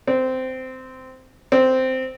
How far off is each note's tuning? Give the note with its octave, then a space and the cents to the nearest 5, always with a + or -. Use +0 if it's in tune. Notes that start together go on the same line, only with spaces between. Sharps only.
C4 -15
C4 -10